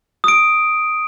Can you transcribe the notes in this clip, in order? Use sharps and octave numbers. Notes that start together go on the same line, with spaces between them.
D#6 D7